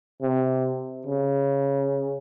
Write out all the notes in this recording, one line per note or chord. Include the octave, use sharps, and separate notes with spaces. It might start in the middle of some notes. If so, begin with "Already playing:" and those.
C3
C#3